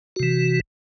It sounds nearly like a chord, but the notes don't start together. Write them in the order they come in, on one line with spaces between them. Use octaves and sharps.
F#4 C3 E3